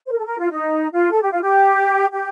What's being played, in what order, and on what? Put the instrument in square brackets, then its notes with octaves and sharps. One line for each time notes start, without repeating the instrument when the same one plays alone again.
[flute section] C5
A#4
A4
A#4
F4
D#4
F4
A4
G4
F4
G4
G4